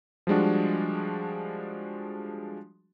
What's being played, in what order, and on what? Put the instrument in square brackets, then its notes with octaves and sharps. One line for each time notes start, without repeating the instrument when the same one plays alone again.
[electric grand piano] F3 G3 G#3 D4 F#4